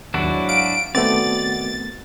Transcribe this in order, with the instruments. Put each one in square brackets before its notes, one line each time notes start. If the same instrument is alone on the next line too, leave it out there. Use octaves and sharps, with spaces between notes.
[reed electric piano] D#2 [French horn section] G#2 F#3 [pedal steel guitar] D4 E4 F#4
[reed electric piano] F5 [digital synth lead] D7
[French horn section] D#3 F#4 [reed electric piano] A3 B3 C4 [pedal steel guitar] D5 [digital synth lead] A6